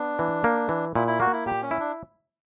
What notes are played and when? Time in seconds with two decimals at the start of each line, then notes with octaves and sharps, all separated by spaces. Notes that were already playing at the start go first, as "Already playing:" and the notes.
Already playing: B3 D4
0.19 E3
0.44 A#3
0.69 E3
0.95 A#2 E4
1.07 E4
1.20 A#3 F#4
1.33 E4
1.46 A#2 G4
1.62 C#4
1.71 E4
1.80 D4